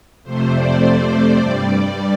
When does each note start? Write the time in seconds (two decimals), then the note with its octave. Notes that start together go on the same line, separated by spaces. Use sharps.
0.23 F2 C3 A3 C5
0.52 D5
0.80 C5
1.10 C5
1.38 G2 G3 D5